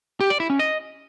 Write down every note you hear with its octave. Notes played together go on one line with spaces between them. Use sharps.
G4
D5
E4
C#4
D#5